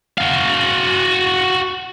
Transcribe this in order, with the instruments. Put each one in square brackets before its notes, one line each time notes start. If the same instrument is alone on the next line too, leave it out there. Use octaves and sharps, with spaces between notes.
[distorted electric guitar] F#4 F5